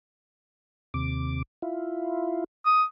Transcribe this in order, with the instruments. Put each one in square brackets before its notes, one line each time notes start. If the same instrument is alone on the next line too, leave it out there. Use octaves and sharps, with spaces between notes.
[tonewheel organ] D#2 C3 D6
E4 F4
[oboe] D#6